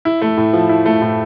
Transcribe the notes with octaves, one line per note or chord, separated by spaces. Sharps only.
E4
A3
A2
F3
E4
A3
A2